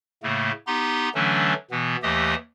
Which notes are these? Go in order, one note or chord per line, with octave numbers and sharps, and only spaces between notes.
A2 C#3 A3 A#3
B3 D#4 G4 A#5 C6
D3 E3 F#3 A3 C#4 D4
B2 E3 B3
D#2 E3 A3 G4 D#5 D#6